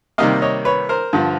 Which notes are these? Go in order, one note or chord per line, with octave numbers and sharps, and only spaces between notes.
C3 D#3 G3 A#3 D#5 F5
C#5 D#5
B4 C#5
A#4 C5
G2 D3 F3